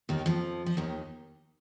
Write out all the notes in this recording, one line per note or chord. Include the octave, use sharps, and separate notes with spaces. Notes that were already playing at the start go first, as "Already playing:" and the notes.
D#2 D#3
F2 F3
F3
D#2 D#3